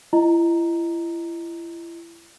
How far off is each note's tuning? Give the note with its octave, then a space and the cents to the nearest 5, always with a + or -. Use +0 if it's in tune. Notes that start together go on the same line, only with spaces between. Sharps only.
E4 +35 D#5 +0 A#5 +0